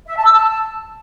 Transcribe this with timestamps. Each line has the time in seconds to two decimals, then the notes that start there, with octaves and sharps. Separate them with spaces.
0.07 E5
0.16 A5
0.25 E6
0.33 A5